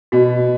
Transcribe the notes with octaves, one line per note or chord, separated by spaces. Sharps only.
B2 F#4